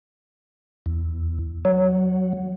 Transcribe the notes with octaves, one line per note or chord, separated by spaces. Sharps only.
E2
F#3